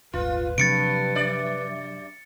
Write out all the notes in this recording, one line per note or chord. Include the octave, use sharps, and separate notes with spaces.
D#1 G#1 F4 B4
G2 C3 F3 F#3 A6 C#7 D7
F#2 D5